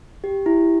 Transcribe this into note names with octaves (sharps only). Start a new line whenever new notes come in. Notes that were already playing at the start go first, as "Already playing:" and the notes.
G4
E4